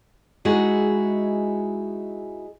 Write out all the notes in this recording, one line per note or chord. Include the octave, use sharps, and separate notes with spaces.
G#3 D#4 E4 F#4 G#4